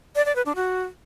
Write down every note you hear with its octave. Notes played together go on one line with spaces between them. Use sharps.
D5
D5
B4
D4
F#4